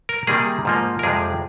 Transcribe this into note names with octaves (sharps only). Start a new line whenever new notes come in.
A#4
C3 D#3 G3 A#3 G#4
G#2 F3 A#3
A#4
F2 C3 F3 G#3 G#4